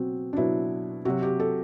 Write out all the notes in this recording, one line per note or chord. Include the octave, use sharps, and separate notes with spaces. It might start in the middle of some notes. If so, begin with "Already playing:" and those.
Already playing: B2 F#3 C4 F#4
D4
B2 F#3 E4
C3 F#3 F#4
G4
A4